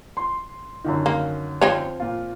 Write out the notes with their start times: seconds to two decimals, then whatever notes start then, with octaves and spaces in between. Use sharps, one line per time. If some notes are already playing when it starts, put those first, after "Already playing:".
0.17 C6
0.84 F#2 D3 D#3
1.06 A#3
1.61 F3 C4 C#5
2.00 A#2 F4